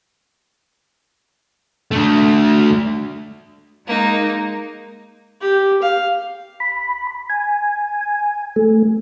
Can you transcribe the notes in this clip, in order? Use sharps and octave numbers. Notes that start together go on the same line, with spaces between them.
D3 A3
G#3 A#3 D#4
G4
F5
B5
G#5
A3